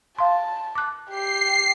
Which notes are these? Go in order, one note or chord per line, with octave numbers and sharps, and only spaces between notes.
F5 A5 C6
D6 F#6
G4 C7